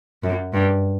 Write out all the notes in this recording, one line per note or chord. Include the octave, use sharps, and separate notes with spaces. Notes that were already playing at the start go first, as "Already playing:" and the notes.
F#2
G2